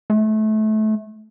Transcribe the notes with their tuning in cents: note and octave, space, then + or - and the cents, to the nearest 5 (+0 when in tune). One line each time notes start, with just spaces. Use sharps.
A3 -25